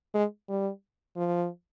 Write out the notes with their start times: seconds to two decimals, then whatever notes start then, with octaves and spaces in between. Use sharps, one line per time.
0.14 G#3
0.49 G3
1.16 F3